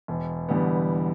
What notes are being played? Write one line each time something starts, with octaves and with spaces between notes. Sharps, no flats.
E1
E2 D3 G3 B3